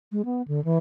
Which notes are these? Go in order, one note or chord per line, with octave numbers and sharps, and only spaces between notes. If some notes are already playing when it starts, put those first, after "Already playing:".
G#3
B3
D3
E3